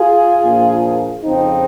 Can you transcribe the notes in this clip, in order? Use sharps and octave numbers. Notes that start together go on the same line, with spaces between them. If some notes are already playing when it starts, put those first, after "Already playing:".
Already playing: F4 G#4
A#1 A#2 F3
F2 C#3 F3 C4 D#4